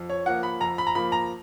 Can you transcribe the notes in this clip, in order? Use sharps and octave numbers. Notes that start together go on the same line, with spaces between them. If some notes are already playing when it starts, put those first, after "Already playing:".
Already playing: F2
C#5
F3 A#3 F#5
B5
F2 A#5
B5
A#5
F3 A#3 B5
A#5